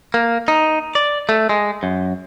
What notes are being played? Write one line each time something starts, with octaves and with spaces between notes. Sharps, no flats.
A#3
D#4
D5
A3
G#3
F#2